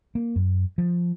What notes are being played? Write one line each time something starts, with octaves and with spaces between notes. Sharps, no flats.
A#3
F#2
F3